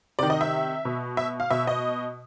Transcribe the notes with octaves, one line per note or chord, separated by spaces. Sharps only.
C3 D#3 D5
D#5
E5
B2
E5
F5
B2 E5
D#5